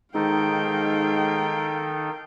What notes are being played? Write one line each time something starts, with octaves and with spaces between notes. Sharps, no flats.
G#2 D#3 D#4 A4 F5 G5